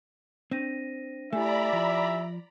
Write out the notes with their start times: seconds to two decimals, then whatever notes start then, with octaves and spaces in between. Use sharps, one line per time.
0.51 C4 D4 A#6 D#7
1.33 A3 E4 G4 D5 E5 G#5 A#5 B5
1.73 F3